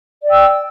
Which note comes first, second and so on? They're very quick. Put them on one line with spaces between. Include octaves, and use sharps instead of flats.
D5 G5 E6